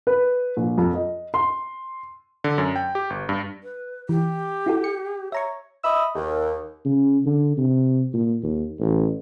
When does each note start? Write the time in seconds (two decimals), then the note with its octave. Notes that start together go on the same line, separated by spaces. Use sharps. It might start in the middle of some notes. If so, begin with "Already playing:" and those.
0.07 B4
0.57 A#1
0.78 F2
0.94 D#5
1.34 C6
2.44 D3
2.58 F#2
2.76 G5
2.95 G4
3.10 G1
3.29 G2
3.63 B4
4.09 E3 G4
4.66 E4 F#4 A4
4.84 C#7
5.32 C#5 E5 A#5 C#6
5.84 D#5 E5 B5 D#6 E6
6.15 D#2
6.85 C#3
7.26 D3
7.57 C3
8.14 A#2
8.43 D#2
8.80 A1